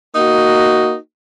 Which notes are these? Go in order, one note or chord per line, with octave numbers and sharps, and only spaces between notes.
A#3 D#4 F#4